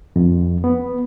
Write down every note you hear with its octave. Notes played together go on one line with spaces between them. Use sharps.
F2
B3